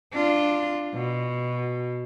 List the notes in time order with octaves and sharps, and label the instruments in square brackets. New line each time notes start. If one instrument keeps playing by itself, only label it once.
[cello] D4 F4
B2